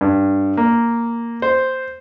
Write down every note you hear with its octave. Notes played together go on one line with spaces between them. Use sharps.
G2
A#3
C5